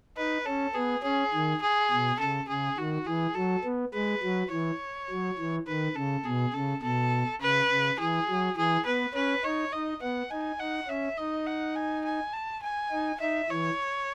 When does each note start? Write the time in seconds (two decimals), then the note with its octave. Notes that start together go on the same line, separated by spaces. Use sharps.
0.17 D#4 B4
0.46 C#4 A4
0.75 B3 G#4
1.04 C#4 G#4
1.33 D#3
1.62 G#4
1.91 B2
2.20 C#3 A4
2.48 C#3 G#4
2.77 D#3 F#4
3.07 E3 G#4
3.35 F#3 A4
3.64 B3
3.94 G#3 B4
4.22 F#3
4.51 E3 C#5
5.10 F#3
5.39 E3
5.67 D#3 B4
5.96 C#3 A4
6.25 B2 G#4
6.54 C#3 A4
6.83 B2 A4
7.41 C#3 B4
7.70 C#3
7.99 E3 G#4
8.29 F#3
8.57 E3 G#4
8.85 B3 B4
9.15 C#4 B4
9.44 D#4 C#5
9.72 D#4 D#5
10.02 B3 F#5
10.31 D#4 G#5
10.60 D#4 F#5
10.88 C#4 E5
11.18 D#4 D#5
11.47 F#5
11.76 G#5
12.05 G#5
12.33 A5
12.63 G#5
12.92 D#4
13.21 D#4 E5
13.50 E3 C#5